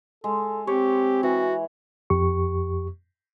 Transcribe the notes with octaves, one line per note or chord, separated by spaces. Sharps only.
G#3 A4
C4 G4 C#5
E3 F#4
F2 G4 C#6